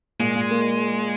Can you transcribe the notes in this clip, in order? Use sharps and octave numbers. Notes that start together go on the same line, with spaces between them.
A#2 G#3
A#2
A#3